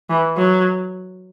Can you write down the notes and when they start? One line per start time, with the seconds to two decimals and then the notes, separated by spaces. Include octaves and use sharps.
0.10 E3
0.37 F#3